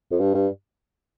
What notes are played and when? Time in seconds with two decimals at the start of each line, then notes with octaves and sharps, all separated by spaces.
0.11 F2
0.20 G2
0.34 G2